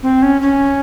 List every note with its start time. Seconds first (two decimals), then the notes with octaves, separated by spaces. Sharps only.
0.03 C4
0.22 C#4
0.42 C#4